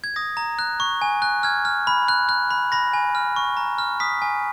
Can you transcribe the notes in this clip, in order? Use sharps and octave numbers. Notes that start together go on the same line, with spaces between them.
G#6
D#6 A#6
A#5
F#6
C#6
G#5
F#6
F6 G#6
F6
B5
F#6
F#6
B5
B5 A#6
G#5
F6
C#6
A#5
F6
D#6 B6
G#5